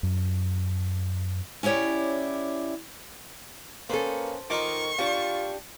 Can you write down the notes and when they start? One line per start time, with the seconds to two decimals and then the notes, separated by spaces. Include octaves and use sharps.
0.03 F#2
1.63 C#4 E4 G4 C#5 D5
3.89 A#3 B3 C#4 A4 C5
4.50 D#3 D#4 F4 C#6 D6
4.99 D4 F4 G4 A5